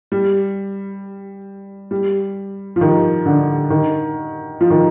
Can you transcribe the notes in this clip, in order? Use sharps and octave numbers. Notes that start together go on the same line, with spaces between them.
G3
G3
F3
D#3
D3
D#3
F3
D#3